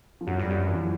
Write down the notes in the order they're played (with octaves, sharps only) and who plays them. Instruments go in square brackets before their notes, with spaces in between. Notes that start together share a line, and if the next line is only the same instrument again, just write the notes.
[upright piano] F3
[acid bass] F#2 [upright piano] F#3
[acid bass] G2 [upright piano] G3
[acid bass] F#2 [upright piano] F#3
[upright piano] E3
F3